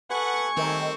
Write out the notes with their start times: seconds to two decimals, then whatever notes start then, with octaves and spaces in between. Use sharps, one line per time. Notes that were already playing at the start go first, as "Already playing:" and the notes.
0.11 A4 B4 F#5 G#5 C#6
0.57 D#3 G3 A3 C4